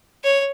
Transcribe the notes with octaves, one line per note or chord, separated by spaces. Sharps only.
C#5